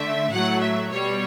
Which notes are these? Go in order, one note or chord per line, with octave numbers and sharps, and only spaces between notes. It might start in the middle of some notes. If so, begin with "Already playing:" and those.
Already playing: D3 A3 E5
A2 F#3 A3 F#5
E5
B2 G3 C#5